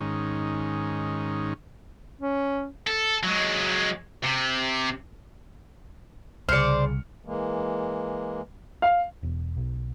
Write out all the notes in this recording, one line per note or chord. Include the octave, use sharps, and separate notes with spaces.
G#2 D#3 C#4
C#4
A4
F#3 G#3
C3
C2 C#3 C5 D5 F6 C#7
E3 G#3 A#3
F5
E1
B1